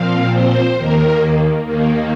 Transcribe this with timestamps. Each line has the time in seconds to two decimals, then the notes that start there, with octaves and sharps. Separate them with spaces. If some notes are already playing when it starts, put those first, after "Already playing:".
Already playing: A#2 F3 C4 F5
0.32 C5
0.76 D#2 D#3 A#3 A#4
1.65 D#2 D#3 A#3